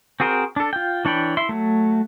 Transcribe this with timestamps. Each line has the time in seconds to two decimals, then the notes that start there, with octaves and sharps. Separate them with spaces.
0.20 C4 F#4 G#4 A#4 C5
0.56 D4 A4
0.73 F4 G5
1.05 E3 D4 C#5 G5 B5
1.37 E4 E5 C6
1.49 F#3 A3